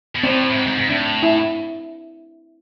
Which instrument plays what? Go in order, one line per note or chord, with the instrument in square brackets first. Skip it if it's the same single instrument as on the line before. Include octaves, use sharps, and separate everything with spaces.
[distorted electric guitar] B2
[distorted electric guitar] A2 [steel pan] C4
[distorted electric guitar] A2
G#2
G#2
G#2
[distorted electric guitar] A2 [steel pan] D4
[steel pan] E4